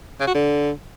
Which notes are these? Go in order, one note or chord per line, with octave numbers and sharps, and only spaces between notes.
C#3
F#4
D3